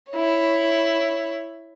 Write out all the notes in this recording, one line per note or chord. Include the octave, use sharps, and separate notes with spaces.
E4 C#5